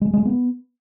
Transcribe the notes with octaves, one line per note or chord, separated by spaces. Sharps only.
G#3
G#3
B3